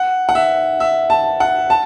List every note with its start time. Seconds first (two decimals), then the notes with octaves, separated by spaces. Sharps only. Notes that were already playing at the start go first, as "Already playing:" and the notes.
Already playing: F#5
0.29 F#5
0.35 E5
0.80 E5
1.10 A5
1.40 F#5
1.70 A5